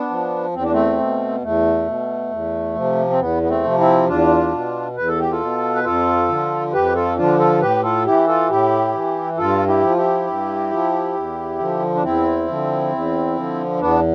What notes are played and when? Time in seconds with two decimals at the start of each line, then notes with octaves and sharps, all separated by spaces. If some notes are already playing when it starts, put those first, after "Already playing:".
Already playing: B3 D4
0.10 F3
0.54 E2 C4
0.63 D4
0.72 A3 C4
0.99 B2
1.43 E2 A3
1.87 B2
2.31 E2
2.75 C3 F3
3.10 C4
3.19 E2 B3
3.43 B3
3.49 A3 C4
3.64 C3 F3
3.78 C4 E4
4.08 E2 D4 F4
4.52 B2
4.96 E2 B4
5.08 A4
5.20 G4
5.31 F4 A4
5.40 B2
5.75 B4
5.84 F2 F4 A4
6.29 D3 F3
6.73 F2 G4 B4
6.95 F4 A4
7.17 D3 F3 D4 F4
7.39 F4 A4
7.61 A2 G4 B4
7.83 F4 A4
8.05 E3 E4 G4
8.28 F4 A4
8.50 A2 E4 G4
8.94 E3
9.38 G2 F4 A4
9.67 E4 G4
9.82 F3
9.90 F4
9.97 E4 G4
10.27 G2
10.71 F3
11.15 E2
11.58 D3 F3
11.95 D4
12.03 E2 C4 E4
12.47 D3 F3
12.92 E2
13.36 D3 F3
13.80 E2 B3 D4